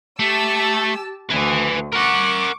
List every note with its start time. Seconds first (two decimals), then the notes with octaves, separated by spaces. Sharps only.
0.19 A3 G4 A5 E6
1.30 D2 B4 G#5
1.92 A#4 F#5 C#6 D6